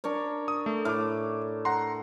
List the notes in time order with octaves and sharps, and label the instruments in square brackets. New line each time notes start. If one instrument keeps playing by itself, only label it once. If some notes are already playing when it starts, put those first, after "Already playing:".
[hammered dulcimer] D4 A#4 C#5
[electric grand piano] D#6
A3
[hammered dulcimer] A2 [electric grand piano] D6 F6
[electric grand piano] F#5 A#5 C6